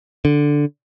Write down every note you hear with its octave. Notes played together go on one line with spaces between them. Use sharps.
D3